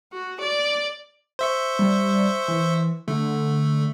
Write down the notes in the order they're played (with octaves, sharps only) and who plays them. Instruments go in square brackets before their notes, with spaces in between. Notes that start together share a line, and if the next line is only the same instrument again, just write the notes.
[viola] F#4
D5
[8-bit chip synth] C5 E5 C#6
[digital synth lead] G3
E3
[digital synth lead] D3 [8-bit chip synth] A3